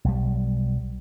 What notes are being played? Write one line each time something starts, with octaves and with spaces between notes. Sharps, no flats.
B1 G3